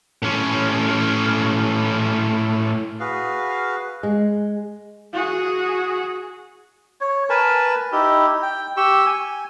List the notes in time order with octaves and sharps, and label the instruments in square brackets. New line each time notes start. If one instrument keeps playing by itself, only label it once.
[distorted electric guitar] A2 C#4
[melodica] F#4 G#4 B4 F5
[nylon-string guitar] G#3
[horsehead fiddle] F#4 G#4
[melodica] C#5
A#4 B4 G#5 A5
D#4 E4 G4
G5
G4 C#6 E6
G#5